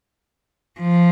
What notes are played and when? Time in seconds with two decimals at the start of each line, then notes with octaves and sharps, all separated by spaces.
0.80 F3